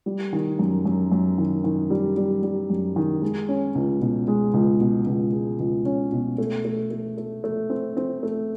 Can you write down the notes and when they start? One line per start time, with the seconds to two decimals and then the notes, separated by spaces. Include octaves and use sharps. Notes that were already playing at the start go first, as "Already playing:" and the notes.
0.06 G3
0.33 D#3
0.59 F#2
0.85 F#2
1.12 F#2
1.38 D#3
1.64 D#3
1.90 G3
2.17 G3
2.43 G3
2.70 F#2
2.96 D#3
3.22 G#3
3.49 C#4
3.75 C#2
4.01 B2
4.28 G#3
4.54 C#2
4.80 B2
5.06 C#2
5.33 G#3
5.59 C#2
5.85 C#4
6.12 B2
6.38 A3
6.65 A3
6.91 A3
7.18 A3
7.44 A3
7.70 C4
7.97 C4
8.23 A3